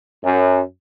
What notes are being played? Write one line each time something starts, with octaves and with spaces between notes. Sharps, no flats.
F#2